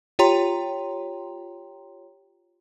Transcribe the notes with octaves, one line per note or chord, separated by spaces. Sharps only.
F4 G4 C#5 G5 A#5 C6